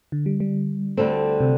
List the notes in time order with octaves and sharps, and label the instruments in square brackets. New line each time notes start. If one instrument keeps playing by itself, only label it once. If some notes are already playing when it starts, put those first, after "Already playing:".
[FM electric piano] D3
G3
G3
[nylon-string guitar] D2 D3 G3 C4 A4
[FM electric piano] C3